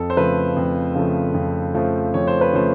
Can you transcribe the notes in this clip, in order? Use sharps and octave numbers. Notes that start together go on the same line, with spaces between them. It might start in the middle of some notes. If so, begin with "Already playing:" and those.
Already playing: F2 A4
C5
C#3 F3 A3 B4
F2
C#3 F3 A3
F2
C#3 F3 A3
F2 C#5
C5
B4
C#3 F3 A3 C5